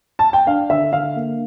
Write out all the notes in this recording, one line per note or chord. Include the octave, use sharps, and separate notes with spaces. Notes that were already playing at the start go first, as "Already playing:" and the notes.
A5
G5
D4 F5
D3 E5
D3 F5
A#3